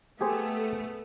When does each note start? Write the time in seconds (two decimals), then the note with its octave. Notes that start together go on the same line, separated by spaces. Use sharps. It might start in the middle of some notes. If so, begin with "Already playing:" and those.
0.21 A3 B3 G4 G#4 C5